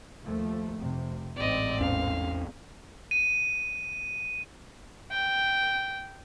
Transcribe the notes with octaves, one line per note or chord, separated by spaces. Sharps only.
D#2 F3 A3
F1 C3
A1 G#2 C4 D5 D#5
E2 C#4 F5
D#7
G5